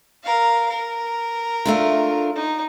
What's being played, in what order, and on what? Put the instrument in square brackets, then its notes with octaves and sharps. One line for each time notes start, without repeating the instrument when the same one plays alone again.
[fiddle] A#4 F5
A#4
[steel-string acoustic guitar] A3 D4 F4
[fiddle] D#4